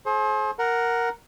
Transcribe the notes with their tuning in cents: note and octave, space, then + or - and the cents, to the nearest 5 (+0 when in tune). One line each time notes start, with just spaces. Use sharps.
G#4 +45 C5 +30
A#4 +0 F#5 +0